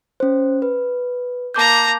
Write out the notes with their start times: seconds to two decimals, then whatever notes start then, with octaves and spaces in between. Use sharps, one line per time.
0.20 C#4 C5
0.62 B4
1.54 A#3 A5 A#5 D6 G6